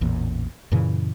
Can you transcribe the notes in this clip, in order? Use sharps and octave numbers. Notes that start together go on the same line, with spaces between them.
A1 E2 A#2
F#2 A#2 C#3 E3